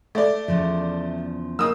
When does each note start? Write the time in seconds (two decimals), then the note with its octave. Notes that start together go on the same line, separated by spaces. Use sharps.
0.15 A3 D5
0.48 E2 C#3 F3
1.59 A#3 D#4 D#6 E6